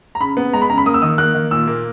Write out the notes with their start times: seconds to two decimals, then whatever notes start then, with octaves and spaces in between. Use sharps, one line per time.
0.15 A#5
0.20 C#3 B5
0.37 B3
0.53 G#3 A#5
0.62 B5
0.70 C#3 A#5
0.78 B5
0.86 A#3 D#6
0.94 E6
1.02 D#3 D#6
1.18 A#3 F#6
1.35 D#3
1.51 A#2 E6
1.67 A#3